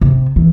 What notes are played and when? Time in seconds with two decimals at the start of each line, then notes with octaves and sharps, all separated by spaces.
0.01 C3
0.36 E3